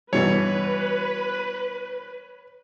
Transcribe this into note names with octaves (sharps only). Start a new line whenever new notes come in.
G2 B2 E3 B4 C#5